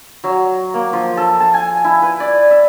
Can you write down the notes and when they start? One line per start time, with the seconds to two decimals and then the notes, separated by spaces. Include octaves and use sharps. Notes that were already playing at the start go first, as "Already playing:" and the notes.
0.24 F#3
0.74 A#3
0.93 F3
1.17 A4
1.40 A5
1.54 G#5
1.84 E4
2.02 B4
2.20 D5
2.51 E5